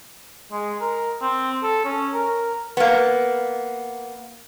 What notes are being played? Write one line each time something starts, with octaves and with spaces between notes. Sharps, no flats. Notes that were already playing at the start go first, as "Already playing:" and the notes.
G#3
A#4
C4
A4
C#4
A#4
A#3 B3